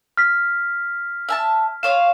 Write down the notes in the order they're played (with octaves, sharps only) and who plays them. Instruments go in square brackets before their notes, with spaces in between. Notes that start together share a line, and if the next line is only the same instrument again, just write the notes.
[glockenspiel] F6 B6
[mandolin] E5 G#5 A5
[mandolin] F4 C#5 F5 [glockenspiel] E7